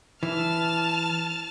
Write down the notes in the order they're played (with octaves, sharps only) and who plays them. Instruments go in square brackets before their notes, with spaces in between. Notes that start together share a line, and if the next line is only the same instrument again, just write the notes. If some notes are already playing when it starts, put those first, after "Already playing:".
[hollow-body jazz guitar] E3 [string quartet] A5 F6